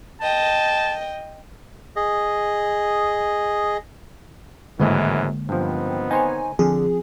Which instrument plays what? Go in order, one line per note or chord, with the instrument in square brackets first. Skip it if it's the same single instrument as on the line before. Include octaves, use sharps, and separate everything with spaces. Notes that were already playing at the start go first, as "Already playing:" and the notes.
[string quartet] D#5 G5 [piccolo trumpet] A5
[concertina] G#4 D#5
[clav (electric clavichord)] G#1 A2 D#5 [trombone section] F#2 E3 [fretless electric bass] D3 G#3 A#3
[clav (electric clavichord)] G2 F3 [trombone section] D#3 B3 C4
[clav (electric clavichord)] D#4 C5 C#5 [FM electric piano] G#5
[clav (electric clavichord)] D3 [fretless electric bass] F3 C4 [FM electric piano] G#4